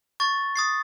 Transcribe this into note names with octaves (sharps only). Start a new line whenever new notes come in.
C#6 A6
D#6 A6 C7